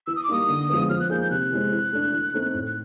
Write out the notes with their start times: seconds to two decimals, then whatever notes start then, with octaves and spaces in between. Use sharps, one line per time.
0.07 E3 E6
0.16 D#6
0.24 D6
0.28 G3 A#3 D#4 D#6
0.49 D3
0.69 F3 G#3 B3
0.90 F3 F6
1.00 F#6
1.10 A#3 D#4 G#4 G6
1.21 G6
1.31 C3 F#6
1.52 E3 G#3 C4
1.72 E3
1.92 A3 D4
2.13 E3
2.34 A3 C4 D#4
2.54 A2